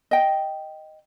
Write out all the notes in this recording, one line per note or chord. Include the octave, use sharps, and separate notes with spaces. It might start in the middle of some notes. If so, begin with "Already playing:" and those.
D#5 G5